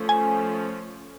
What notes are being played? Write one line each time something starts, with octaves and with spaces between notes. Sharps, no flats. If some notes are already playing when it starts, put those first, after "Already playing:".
Already playing: F3 A3 C#4
G#5